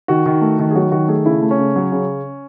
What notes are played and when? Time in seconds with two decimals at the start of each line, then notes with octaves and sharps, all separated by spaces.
0.08 D#3 F#4
0.26 D#3
0.41 A3
0.59 D#3
0.71 G#4
0.75 F#3 F#4
0.92 D#3 F#4
1.08 A3 G#4
1.26 C#3 E4
1.42 A3
1.51 C#4
1.58 C#3
1.76 F#3
1.92 C#3